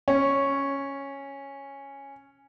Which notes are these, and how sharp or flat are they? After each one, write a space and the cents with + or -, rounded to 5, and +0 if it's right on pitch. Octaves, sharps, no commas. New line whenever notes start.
C#4 -5